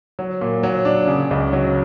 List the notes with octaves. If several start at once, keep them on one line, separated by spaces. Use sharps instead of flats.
F#3
A#2
F#3
D4
C#3
C#2
F#3